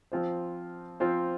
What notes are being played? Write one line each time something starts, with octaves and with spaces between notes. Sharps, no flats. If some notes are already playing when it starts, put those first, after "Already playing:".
F3 C4 F4 C5
F3 C4 F4 C5